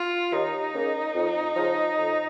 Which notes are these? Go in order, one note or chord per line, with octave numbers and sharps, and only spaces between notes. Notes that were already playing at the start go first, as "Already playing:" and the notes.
Already playing: F4
D#2 D#4
C#3 A#3
F2
C#3 F3
F2